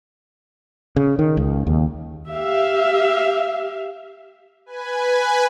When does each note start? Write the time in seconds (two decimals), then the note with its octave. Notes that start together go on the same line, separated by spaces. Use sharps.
0.96 C#3
1.19 D#3
1.37 C#2
1.67 D#2
2.31 G4 E5 F5
4.66 B4 G#5